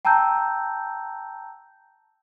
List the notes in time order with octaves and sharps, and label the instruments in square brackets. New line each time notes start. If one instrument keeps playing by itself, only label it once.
[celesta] G5 A5 A#5 E6 G6